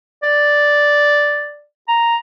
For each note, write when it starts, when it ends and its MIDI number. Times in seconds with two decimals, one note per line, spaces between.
0.23 1.64 74
1.88 2.16 82